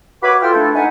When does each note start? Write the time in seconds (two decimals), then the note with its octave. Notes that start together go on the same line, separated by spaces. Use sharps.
0.23 F#4 B4 C#5 E5 B5 D6
0.41 F4 A4 G5 F6
0.54 A3 D4 E4 A4
0.75 D#4 B4 F#5 G#5